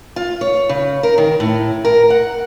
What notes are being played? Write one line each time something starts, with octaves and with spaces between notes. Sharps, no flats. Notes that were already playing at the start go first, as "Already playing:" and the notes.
F4
C#5
C#3
A#4
D#3
A2
A#4
F#5